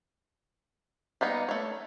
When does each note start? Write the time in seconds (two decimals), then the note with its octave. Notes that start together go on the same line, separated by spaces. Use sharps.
1.21 G3 A#3 B3 D#4
1.49 A3 C#5